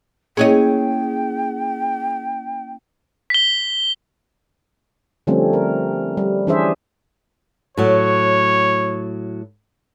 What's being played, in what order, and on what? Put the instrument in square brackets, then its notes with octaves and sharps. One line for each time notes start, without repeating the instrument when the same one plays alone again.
[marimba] A#3 C#4 E4 [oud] G#4 C#5 D#5 [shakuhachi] G5
[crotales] B6 G7
[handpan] D3 F3 G3 A3 C4 C#4
A#4
G3
E3 C#4 D4 G#4 C5 E5
[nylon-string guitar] A2 F#3 [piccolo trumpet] C#5